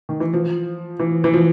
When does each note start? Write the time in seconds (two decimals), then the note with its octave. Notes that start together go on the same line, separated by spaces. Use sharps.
0.09 D#3
0.20 E3
0.34 F3
0.99 E3
1.24 E3
1.33 F3